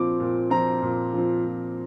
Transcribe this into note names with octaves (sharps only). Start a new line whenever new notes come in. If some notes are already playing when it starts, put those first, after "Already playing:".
Already playing: A#2 F3 C4 D6
A#2
F3 C4 A#5
A#2
F3 C4
A#2